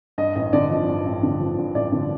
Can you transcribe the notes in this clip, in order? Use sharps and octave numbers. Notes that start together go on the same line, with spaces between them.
G2 D#5
A1 D#5
D3 D5
F3 D#5
G2
A1
D3
F3
G2
A1 D5
D3